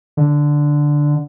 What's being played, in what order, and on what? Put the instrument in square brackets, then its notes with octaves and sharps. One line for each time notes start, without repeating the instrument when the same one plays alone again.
[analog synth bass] D3